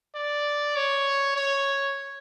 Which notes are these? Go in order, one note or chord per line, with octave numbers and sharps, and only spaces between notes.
D5
C#5
C#5